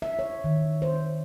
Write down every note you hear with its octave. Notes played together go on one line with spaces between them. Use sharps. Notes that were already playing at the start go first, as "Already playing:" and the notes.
E5
C#5
D#3
C5